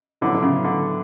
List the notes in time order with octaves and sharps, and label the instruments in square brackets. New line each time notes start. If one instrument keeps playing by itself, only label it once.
[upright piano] A2 F#3 B3 E4 A4 [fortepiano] D3
[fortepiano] D3
C#3
D3